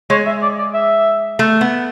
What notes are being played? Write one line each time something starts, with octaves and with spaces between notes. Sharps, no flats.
G#3 C#5
E5
D5
D5
E5
A3
B3